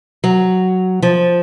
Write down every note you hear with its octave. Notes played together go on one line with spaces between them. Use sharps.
F#3
F3